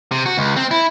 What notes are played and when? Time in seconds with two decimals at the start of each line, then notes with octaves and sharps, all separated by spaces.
0.11 C3
0.26 F#4
0.38 C#2
0.56 C4
0.71 E4